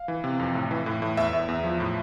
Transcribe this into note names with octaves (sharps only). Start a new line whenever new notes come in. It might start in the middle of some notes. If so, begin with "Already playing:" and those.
Already playing: F5
E3
C3
F2
A2
E3
A2
A2
E2 E5
E2
E2
F3
A2